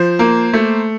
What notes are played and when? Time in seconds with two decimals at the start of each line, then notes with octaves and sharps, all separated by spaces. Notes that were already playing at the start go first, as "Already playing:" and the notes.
Already playing: F3 C5
0.19 A#3
0.54 A3